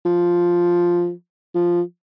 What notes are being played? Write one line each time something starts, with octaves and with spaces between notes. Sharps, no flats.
F3
F3